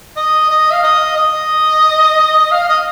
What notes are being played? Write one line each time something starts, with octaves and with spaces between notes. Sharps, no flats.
D#5
D#5
F5
D#5
D#5
F5
D#5